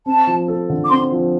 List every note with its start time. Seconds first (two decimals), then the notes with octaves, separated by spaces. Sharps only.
0.06 C4 A5
0.27 F3
0.48 A4
0.70 D3
0.84 D6
0.90 C4 C6
1.12 F3